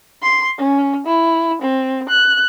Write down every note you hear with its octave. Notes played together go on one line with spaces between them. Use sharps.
C6
C#4
E4
C4
F#6